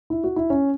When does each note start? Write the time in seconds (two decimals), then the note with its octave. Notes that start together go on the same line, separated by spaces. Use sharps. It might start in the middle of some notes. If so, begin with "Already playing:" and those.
0.10 E4
0.24 F#4
0.36 E4
0.50 C#4